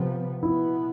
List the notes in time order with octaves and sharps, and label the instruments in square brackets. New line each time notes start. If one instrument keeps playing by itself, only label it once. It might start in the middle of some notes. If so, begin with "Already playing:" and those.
Already playing: [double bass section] C3 F3 B3
[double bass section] B2 B3 [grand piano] E4